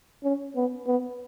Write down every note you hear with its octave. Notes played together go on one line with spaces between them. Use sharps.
C#4
B3
B3